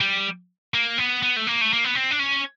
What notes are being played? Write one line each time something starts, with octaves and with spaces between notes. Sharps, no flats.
G3
A#3
B3
B3
A3
A#3
A3
A#3
B3
C4
D4
C#4